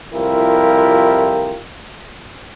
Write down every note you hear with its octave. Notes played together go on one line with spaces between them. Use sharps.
C2 F2 E4 F4 G4 A#4